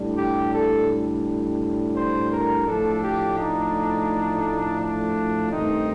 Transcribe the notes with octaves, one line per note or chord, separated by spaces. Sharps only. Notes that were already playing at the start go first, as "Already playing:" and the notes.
Already playing: A2 G3 D4
G4
A4
C5
A#4
A2 F3 A3 D4 A4
G4
D#4
D4
G2 D#3 A3 C4 D#4